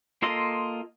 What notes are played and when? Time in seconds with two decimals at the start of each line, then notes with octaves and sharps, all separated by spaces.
0.22 A#3 F4 A4 D#5 C6